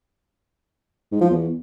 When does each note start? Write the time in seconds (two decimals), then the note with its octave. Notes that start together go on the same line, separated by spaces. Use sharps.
1.12 G#2
1.21 F3
1.30 E2